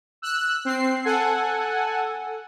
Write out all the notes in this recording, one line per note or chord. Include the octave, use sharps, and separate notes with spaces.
E6 F#6
C4 C7
A4 F#5 G#5